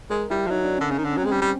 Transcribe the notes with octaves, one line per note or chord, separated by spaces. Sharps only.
G#3 A#4
G3 E4
F3
F#3 D#4
D4
D3 C#4
C#3 C#4
D#3
D3
C#4
F#3
G#3 C4
G3 C#4
G3